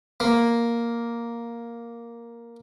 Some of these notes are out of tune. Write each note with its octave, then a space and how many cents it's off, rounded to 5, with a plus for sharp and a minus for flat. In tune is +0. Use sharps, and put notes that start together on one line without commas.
A#3 +5